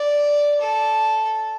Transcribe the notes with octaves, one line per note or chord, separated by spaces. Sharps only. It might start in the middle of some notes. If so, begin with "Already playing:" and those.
Already playing: D5
A4